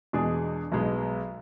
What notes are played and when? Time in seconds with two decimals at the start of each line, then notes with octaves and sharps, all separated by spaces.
0.13 E2 B2 G#3 D4 G#4
0.72 B1 B2 G#3 B3